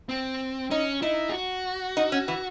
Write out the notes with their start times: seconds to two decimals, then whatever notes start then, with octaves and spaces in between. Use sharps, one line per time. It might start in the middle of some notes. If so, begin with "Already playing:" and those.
0.09 C4
0.71 C#4 D#4
1.02 D#4 E4
1.29 G#4
1.33 F#4
1.97 D#4
2.12 C#4
2.28 E3